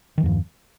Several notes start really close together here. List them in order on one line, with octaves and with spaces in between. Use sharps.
D#3 F3 E2 G2